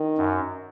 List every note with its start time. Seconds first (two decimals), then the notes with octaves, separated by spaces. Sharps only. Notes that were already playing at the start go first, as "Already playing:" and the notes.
Already playing: D#3
0.18 F#2